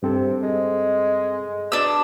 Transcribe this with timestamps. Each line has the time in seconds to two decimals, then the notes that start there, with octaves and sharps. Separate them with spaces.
0.03 G2 C3 C4 A4
0.43 G#3
1.72 B2 D4 E6